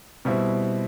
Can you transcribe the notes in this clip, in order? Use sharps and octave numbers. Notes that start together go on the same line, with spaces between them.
B2 G3 C4 E4